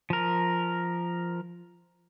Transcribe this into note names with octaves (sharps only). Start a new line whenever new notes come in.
F3 A#4